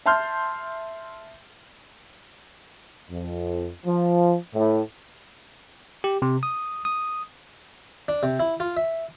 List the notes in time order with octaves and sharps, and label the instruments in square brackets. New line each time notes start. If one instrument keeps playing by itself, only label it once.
[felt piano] E5 A5 C6 F6 G6
[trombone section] F2
F3
A2
[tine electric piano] G4
C3
D#6
D#6
[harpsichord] D4
C3
E4
F4
E5